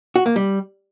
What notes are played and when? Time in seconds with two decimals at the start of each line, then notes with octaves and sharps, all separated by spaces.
0.16 F#4
0.26 A#3
0.36 G3